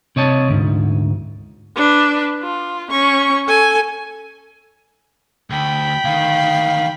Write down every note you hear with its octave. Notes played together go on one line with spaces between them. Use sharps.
C3 C#5 D#5 A5
D2 G#2
D4 B4
F4
C#4 C#6
A4 G#5
D2 G5 B5
D2 D#3 F5